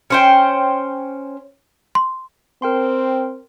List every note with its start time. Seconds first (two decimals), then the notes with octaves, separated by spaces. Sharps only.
0.10 C#4 C5 G5
1.95 C6
2.62 C4 A#4 G5 C6